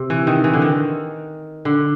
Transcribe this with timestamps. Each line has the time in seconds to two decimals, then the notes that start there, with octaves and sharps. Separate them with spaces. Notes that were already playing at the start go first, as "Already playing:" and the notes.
Already playing: C3
0.10 E3
0.27 D#3
0.44 E3
0.54 D3
0.62 D#3
1.65 D3